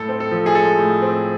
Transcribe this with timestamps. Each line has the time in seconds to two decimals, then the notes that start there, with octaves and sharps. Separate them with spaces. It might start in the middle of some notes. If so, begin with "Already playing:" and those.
Already playing: A2 A4
0.09 C4
0.20 A4
0.31 F3
0.46 G#4
0.55 G#3 A4
0.79 A2
1.02 C4